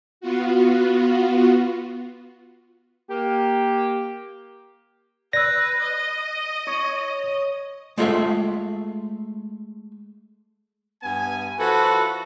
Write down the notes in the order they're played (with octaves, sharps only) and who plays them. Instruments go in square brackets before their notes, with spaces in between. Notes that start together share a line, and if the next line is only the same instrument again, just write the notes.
[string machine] B3 F4 F#4
[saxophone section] A#3 G4
[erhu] B4 [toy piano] D5 E6 [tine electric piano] A#6
[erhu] D#5
[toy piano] E4 [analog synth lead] C#5
[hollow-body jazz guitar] G#3 A3 F4 D5 E5 F5
[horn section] G2 B3 G#5
[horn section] F3 E4 F#4 [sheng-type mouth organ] A4 B4